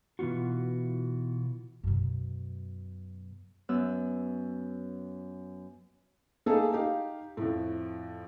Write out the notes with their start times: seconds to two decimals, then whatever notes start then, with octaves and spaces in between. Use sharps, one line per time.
0.19 B2 E3 B3 F4 F#4
1.83 F#2 B2
3.69 F#2 B3 E6
6.46 A3 A#3 D#4 G#4 A4
6.72 D#4 G4 F5
7.37 F2 A2